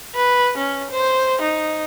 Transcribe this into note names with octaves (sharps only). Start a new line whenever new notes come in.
B4
C#4
C5
D#4